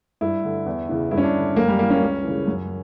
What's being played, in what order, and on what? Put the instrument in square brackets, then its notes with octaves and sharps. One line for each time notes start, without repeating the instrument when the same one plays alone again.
[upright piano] G2 E4
D3
E2
C#3 E3
G2 E4
C#4
D4
D3
F#2 A#3
G3
E3 A#3
C#4
C#2
C#3 E3
F#2